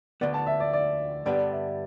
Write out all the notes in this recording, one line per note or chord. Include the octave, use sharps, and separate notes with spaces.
D2 D3 B3 D5
A5
E5
D5
D5
G2 D3 G3 B3 D5
E5